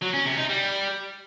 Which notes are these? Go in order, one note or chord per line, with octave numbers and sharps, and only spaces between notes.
F#3
C#4
C3
D#4
G3